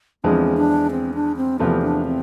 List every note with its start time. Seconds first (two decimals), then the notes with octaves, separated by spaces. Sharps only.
0.24 E2 D3 F3 G#3 C4
0.57 D4
0.91 C4
1.14 D4
1.37 C4
1.59 E2 C3 F3 A3 B3
1.82 D4
2.05 C4